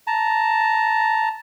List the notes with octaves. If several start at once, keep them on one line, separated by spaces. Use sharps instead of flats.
A5 A#5